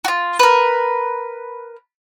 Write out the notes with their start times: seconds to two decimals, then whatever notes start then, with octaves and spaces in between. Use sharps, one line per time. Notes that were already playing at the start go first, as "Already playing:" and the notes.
0.05 F4 F#4
0.39 A#4 B4